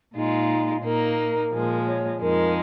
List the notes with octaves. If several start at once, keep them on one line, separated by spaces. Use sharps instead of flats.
A#2 G#3 D#4 F4
A#2 A#3 D#4 A#4
A#2 F3 G#3
C#5
F2 F3 G#3 D#4 A#4